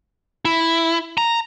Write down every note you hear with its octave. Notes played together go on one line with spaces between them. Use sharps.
E4
A#5